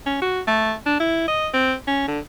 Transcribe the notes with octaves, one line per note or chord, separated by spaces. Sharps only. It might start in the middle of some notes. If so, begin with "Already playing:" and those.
C#4
F#4
A3
D4
E4
D#5
C4
C#4
D3